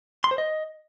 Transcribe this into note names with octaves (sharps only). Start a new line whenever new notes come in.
C6
C5
D#5